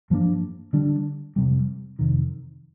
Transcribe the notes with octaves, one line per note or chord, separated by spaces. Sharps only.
G2 F3 A#3 D4
D3 G3 D4
F2 C3 G3
F2 C3 D#3